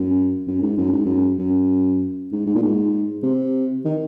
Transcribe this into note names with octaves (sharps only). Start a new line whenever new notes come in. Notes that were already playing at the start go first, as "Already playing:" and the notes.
Already playing: F#2
F#2
G#2
F#2
G#2
F#2
F#2
G#2
G#2
A#2
G#2
C3
D#3